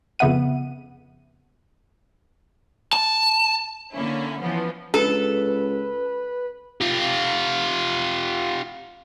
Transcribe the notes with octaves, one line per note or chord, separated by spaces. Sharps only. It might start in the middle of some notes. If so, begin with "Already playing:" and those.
F2 C#3 B3 E5 F#5 D#7
A5
D3 A#3 C#4 E4
E3 F3 B3 C#4
C#2 A4 B4
F4 G4